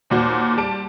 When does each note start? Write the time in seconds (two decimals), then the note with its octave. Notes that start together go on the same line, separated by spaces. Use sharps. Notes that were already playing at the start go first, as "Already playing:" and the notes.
0.10 D#2 A#2 F#4 C5
0.57 G3 A5 D7